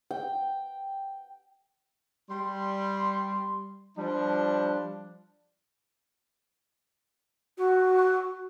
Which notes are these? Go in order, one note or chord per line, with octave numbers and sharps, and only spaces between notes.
G5
G3 C6
F3 G3 D4
F#4